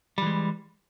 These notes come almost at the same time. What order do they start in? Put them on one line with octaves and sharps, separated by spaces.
G3 E3 G#3